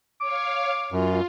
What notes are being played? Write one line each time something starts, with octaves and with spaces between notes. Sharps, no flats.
C#5 F5 D6
F#2 F4